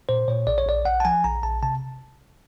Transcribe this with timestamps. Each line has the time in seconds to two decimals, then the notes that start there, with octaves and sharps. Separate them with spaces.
0.09 A#2 C5
0.28 A#2 C#5
0.47 A#1 D5
0.58 C#5
0.66 A#1 D5
0.85 A#1 F#5
1.00 A5
1.05 F3 G#5
1.24 A#1 A#5
1.43 A#1 A5
1.63 C3 A5